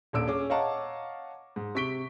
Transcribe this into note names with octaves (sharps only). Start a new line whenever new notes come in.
D#1 A#1 A#2 E6 D7
C#4 G#4 D6
C#5 D#5 F5 F#5 A5 A#5
G#2
C3 C#6 B6 D7 G7